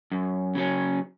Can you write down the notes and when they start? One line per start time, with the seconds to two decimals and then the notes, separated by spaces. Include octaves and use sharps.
0.12 F#2
0.55 C#3 F#3 C#4